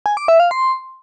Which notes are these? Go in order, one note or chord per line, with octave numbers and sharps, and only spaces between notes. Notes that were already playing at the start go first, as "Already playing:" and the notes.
G#5
D6
E5
F5
C6